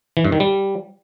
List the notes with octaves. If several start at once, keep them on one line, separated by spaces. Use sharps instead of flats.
E3
G2
D#3
G3